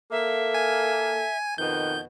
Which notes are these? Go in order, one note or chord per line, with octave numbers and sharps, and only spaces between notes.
A#3 A4 E5
G#5
F2 B2 D#3 B3 G6